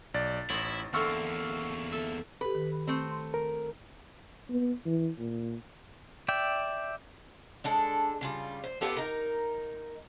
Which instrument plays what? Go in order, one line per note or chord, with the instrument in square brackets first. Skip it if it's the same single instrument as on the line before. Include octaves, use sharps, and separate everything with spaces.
[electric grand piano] B1 D5 A6
[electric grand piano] A1 [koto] D#4 C5 C#5 [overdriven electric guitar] E4
[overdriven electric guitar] E2 A#3 [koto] D3 A3 C4 [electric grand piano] C#6 E6 F6
[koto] A4 E5
[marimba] G4 A4 [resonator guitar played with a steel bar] B4
[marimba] D#3
[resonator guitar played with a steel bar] A3 C4
[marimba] C6
[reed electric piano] A#4
[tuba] B3
E3
A#2
[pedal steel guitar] D5 E5 G5
[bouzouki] G#3 D4 A4
C#3 G3 F4
C5
B3 F4 G4 A4
D#4 A#4